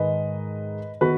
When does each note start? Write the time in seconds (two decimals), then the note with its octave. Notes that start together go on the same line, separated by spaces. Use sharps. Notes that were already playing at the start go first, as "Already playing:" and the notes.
Already playing: G#2 D#3 G#3 B4 D#5
1.01 D#3 B3 F#4 B4